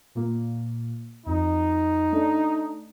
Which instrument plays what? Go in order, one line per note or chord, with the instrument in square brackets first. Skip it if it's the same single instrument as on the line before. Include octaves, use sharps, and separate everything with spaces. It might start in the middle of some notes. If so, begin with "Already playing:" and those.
[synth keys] A#2 A#3
[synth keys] F2 [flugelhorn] D#4
[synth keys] A3 D4